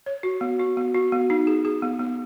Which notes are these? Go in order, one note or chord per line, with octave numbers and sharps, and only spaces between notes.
C#5
F#4
B3
F#4
B3
F#4
B3
D#4
G#4
G#4
B3
B3